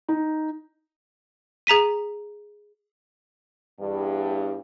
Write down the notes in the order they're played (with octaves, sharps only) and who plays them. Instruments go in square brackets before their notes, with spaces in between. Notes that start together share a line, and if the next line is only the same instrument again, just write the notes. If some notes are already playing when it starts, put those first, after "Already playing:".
[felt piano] D#4
[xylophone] G#4 A#5 B6 D#7
[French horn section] E2 G2